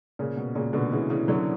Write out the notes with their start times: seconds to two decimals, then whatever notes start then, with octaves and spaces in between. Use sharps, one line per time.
0.19 A#2 C#3
0.37 B2
0.55 A#2 C#3
0.73 B2 D3
0.92 C#3 E3
1.10 C#3 E3
1.28 D3 F#3